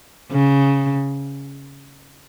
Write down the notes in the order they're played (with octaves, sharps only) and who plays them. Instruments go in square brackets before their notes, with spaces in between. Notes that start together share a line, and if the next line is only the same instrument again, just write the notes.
[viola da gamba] C#3